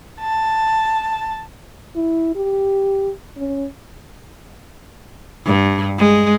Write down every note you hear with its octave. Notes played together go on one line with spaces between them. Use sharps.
A5
E4
G4
C#4
G2
G#3